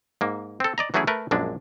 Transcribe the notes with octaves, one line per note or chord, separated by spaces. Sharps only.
G#2 A#3
C4 A4
D5 D#5 A#5
E3 F#3 A3 C#4 E4 G#4
A3 A#4 B4
A#1 F#2 G#3 D4